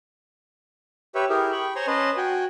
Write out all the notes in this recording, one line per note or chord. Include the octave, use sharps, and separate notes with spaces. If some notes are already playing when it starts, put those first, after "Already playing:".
G4 B4 C#5 E5
E4 G4 G#4 A#4
G5 B5 C#6
C5 C#5 G#5 A#5 C6 C#6
C#4 B4 D#5 A5 C6
F#4 G5 G#5